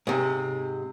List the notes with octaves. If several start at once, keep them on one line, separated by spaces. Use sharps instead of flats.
G#2 C3